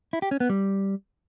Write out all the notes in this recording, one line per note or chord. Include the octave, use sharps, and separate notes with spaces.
E4
G4
C#4
B3
G3